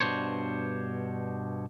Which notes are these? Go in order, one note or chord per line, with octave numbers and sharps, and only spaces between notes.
G2 B2 E3 D4 C5 C#5